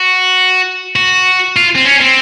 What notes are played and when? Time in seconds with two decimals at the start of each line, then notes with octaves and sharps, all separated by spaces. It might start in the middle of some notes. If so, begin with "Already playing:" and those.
Already playing: F#4
0.96 F#4
1.56 F4
1.75 C4
1.85 C#4
2.01 C4